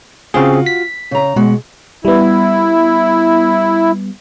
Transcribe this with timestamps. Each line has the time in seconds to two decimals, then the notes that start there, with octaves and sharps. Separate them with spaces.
0.34 C#3 C4 F4 F#4 G#4
0.66 B6
1.11 C#3 A#5
1.36 B2 G#3 F#4
2.05 G3 B3 E4